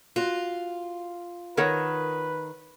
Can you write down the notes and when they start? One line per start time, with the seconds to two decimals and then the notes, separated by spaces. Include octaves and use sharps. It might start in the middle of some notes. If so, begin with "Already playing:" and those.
0.16 F4 F#4
1.57 D#3 A#4 B4 C#5 F#5